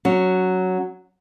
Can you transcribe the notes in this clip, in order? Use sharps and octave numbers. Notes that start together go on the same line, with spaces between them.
F#3 C#4